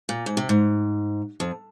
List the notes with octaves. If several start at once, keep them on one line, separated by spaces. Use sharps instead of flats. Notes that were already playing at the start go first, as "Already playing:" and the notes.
A#2
G#2
C3
G#2
F2